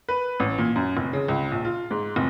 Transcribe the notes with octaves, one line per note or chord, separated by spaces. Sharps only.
B4
A1
A#2
F#2
F1
C#3
C#2
A#1
F4
G#2
F1